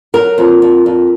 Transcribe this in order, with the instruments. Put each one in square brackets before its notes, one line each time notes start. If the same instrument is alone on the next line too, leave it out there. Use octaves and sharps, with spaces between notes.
[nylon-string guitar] F#3 A#4
F2
F2
F2